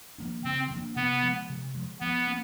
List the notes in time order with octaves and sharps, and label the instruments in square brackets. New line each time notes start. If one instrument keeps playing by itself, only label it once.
[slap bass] F3 A#3 D4
[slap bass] C#3 [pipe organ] C4
[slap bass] F3 A#3 D4
[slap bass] C3 [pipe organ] B3
[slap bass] F3 G#3
C3
F3 G#3
[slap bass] F3 [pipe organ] B3
[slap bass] A#3 C#4